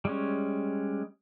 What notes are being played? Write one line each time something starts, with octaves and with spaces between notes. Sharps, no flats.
G3 G#3 C#4